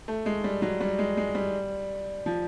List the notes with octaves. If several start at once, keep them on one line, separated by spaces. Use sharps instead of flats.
A3
G#3
G3
F#3
G3
G#3
G#3
G3
F3